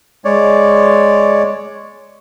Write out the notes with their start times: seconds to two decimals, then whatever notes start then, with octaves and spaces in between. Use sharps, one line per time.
0.25 G#3 C#5 D5